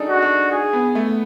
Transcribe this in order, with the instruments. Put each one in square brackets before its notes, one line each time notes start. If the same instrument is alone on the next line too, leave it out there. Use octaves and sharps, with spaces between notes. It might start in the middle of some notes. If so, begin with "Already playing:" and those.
Already playing: [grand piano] D4 D#4 G#4 A4
[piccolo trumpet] F#4
[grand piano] D4
[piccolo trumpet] G#4
[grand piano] B3
A3